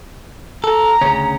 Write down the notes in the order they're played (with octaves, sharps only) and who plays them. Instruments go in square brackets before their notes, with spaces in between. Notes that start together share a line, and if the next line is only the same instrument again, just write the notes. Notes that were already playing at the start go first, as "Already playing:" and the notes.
[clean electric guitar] A4 [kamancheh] A#5
[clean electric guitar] D2 C#3 C#4